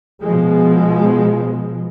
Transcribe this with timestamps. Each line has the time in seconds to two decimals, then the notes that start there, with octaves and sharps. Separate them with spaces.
0.22 B2 F3 G#3